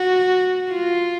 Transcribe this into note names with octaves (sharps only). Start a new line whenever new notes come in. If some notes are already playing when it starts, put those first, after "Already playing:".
Already playing: F#4
F4